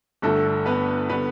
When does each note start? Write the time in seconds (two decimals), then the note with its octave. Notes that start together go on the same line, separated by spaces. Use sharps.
0.22 G1 G2 D3 A3 A4
0.66 B3 B4
1.09 D3 G3 B3 B4